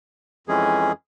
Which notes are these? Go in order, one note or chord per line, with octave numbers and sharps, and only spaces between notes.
F2 E3 G#3 C#4 G#4